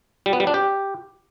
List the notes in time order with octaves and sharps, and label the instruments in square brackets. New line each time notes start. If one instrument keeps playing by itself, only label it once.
[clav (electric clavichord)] G3
B3
G3
D4
G4